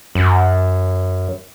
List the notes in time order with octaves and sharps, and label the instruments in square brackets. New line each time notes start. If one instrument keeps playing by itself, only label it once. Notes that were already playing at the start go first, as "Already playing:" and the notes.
[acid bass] F#2